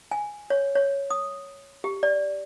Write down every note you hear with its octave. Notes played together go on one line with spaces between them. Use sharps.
G#5
C#5
C#5
D#6
G4
D5